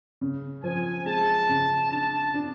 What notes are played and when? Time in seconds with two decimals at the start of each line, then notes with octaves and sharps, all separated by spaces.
0.21 C#3
0.64 F3 G#5
1.06 G#3 A5
1.49 C#3
1.91 D4 A5
2.34 D4